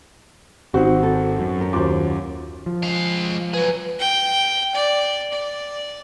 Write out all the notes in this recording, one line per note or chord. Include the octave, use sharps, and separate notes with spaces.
G#1 C4 D#4 F#4 C5
A4
F#2
A#4
D#2 F4 F#4 C5 D6
F3
G#3 F5
F#3 G#4 B4
G5
D5
D5